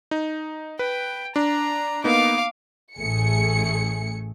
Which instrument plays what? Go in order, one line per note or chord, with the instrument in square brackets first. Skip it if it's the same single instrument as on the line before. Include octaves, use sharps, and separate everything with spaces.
[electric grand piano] D#4
[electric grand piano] B4 [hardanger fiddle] G5
[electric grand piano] D4 [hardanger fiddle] A#5
[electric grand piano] A#3 B3 D#4 [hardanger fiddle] F5 D6
[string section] A1 A2 A3 G#4 C#7